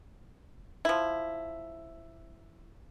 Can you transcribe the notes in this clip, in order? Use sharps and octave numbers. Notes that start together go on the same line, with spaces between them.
F3 E4